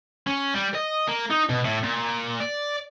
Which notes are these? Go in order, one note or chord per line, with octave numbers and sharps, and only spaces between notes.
C#4
G3
D#5
A#3
D#4
B2
A2
A#2
D5